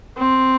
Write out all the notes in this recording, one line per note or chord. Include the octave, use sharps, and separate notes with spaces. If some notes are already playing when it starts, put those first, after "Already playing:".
C4